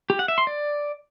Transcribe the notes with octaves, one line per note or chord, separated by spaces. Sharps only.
G4
F#5
E5
C6
D5